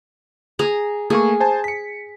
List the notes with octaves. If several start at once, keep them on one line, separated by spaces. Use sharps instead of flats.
G#4 A#5
A3 A#3 G#4 C#6
C5 G#5 A5
B6 C#7